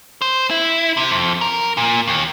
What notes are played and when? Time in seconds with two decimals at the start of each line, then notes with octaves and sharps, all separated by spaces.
0.22 C5
0.51 E4
0.97 C3
1.11 F2
1.41 A#4
1.77 A#2
2.07 D#2